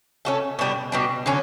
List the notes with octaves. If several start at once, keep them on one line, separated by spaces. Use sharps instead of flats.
A3 C#4 F#4 A4
B2 G3 D4
B2 G3 D4
D3 F#3 C#4